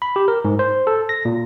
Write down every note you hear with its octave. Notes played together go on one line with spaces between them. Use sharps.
B5
G4
A#4
G#2
C5
A4
A#6
A#2